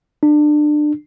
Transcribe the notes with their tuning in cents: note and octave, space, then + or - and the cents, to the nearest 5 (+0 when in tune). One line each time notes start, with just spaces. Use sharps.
D4 +25